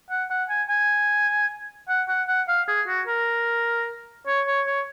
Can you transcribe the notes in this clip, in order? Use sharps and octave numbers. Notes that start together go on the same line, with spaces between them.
F#5
F#5
G#5
G#5
F#5
F#5
F#5
F5
G#4
F#4
A#4
C#5
C#5
C#5